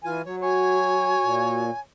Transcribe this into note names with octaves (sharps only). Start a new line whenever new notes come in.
E3 F4 G#5
F#3 C#5
F#4 C#5 G#5
A#2